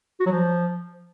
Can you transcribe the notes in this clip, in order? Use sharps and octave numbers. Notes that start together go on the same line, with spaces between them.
F#4
F#3
F3